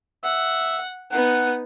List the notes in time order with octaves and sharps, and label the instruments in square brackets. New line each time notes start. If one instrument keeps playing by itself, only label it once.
[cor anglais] E5 [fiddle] F#5
[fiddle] B3 D#4 [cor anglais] F#5